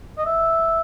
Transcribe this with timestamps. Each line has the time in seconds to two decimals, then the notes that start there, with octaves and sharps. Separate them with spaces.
0.18 D#5
0.26 E5